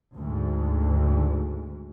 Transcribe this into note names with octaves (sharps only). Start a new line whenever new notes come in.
D2 G#2